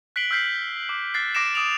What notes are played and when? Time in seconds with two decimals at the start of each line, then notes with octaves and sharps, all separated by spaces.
0.16 F#6 B6 C7 D7 F#7 G7
0.31 E6 F6 G6 B6 C7
0.89 D6
1.14 F#6 A6 C7
1.35 D6 A#6 C7 D7 E7
1.54 D6 D#6 D7 F7 F#7